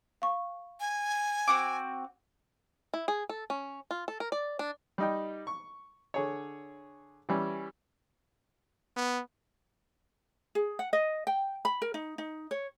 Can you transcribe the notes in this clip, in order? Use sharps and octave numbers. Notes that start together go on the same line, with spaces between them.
F5 C#6
G#5
C4 F#4 D6 E6 D7
E4
G#4
A4
C#4
F4
A4
A#4
D5
D4
G3 D#4 G5
C#6
D3 G#4 C#5
E3 G3 C#4
B3
G#4
F#5
D#5
G5
B5
A#4
D#4
D#4
C#5